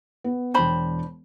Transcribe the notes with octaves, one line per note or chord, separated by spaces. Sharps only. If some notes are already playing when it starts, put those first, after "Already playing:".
B3
E1 D4 C5 G5 B5